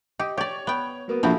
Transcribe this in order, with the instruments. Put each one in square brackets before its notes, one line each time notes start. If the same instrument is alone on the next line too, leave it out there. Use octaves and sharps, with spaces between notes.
[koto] G4 [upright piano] D#5
[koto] G4 D5 [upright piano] C#5
[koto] B3 G5
[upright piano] F#3 A#3 B3
[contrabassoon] A#1 [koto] F3 C4 E4 [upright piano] F#4 A4